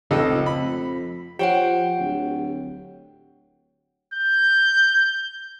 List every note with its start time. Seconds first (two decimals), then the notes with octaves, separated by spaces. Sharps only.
0.11 F1 C#2 A4 D#5
0.46 F2 B5
1.39 F3 G4 C#5 F#5 G5
1.99 D1
4.14 G6